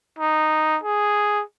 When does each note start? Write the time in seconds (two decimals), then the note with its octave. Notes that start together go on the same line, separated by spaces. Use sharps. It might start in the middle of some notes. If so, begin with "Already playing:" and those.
0.19 D#4
0.83 G#4